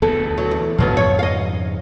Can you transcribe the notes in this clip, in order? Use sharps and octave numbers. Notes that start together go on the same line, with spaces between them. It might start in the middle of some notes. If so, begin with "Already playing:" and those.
D2 B3 A4
F#3
E2
F2 G#2 C#3 F3 F#3 B3
C#5
D#5 F5